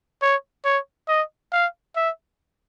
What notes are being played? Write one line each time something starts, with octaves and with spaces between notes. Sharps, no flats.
C#5
C#5
D#5
F5
E5